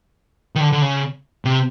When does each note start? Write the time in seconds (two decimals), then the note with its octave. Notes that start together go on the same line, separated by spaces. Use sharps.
0.55 D#3
0.61 D3
0.72 D3
0.82 C#3
1.45 C3